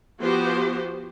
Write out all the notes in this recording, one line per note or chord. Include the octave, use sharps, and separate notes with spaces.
F3 B3 F#4 G4 C5